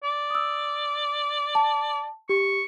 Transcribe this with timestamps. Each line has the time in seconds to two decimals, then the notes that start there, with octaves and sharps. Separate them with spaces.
0.04 D5
0.30 D#6 E6
1.55 A5
2.29 G4 C#6